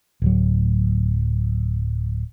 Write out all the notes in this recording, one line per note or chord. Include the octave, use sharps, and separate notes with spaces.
D1 F#3